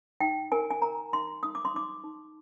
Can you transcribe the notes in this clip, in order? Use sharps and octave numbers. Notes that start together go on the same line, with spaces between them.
D#4 G5
A#4 G#5
G#5
A#4 A#5
D#4 C6
D#4 D#6
D6
C6
D#4 D6
D#4